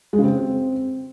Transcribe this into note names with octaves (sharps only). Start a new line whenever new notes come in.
G#3
C#3
C4